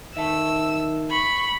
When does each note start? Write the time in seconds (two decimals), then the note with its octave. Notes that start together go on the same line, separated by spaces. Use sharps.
0.17 D#3 E5 A5 E6
1.11 B5 C#6